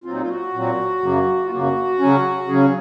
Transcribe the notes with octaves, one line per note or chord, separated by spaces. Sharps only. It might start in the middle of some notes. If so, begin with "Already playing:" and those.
A#2 F#3 C4 F4
D#4
F4
F#4
A#2 F#3 C4
F#2 C#3 F#3 A#3
F4
F#2 C#3 F#3 A#3 F#4
C#3 F#3 C#4
C#3 F#3 C#4 G#4